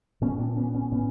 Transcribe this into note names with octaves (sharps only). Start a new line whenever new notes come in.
A#2 B3 C#4
C4 D4
B3 C#4
B3 C#4
A2 B3 C#4